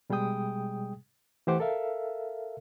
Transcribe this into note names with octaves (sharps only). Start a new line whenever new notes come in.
B2 G3 G#3 G#4 G5 D#6
E3 A3 G4 C5 F#5 D6
A4 A#4 E5 F5